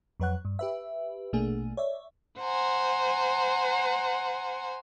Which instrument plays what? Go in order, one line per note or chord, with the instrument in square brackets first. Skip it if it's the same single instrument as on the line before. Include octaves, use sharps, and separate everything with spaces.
[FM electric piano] F2 F#3 B4 C#5 F#5 F#6
G2
G4 B4 E5
A#1 B2 A3 A#3 D4 G#4
C#5 D5 E5
[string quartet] C5 F#5 G#5 A#5